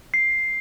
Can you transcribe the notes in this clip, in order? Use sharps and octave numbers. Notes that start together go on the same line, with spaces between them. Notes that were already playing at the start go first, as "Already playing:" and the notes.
C7